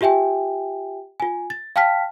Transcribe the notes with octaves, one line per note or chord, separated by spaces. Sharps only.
F4 G4 E5 G5 G#5
F4 G#5
A6
F5 G5 A5 F6 B6